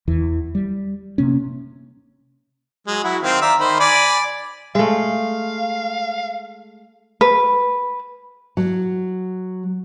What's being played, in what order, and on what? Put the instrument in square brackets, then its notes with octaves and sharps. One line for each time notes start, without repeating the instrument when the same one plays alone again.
[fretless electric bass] E2 E3
G3
C3 A#3 C#4
[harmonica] F#3 G#3
F#3 E4 F#4
D#3 C4 F5
D5 E5 A#5
D#3 C5 B5
D5 G#5 B5
[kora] G#3 A3 [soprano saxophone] F5
[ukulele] B4
[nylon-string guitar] F#3